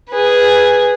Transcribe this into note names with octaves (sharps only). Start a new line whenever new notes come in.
G#4 B4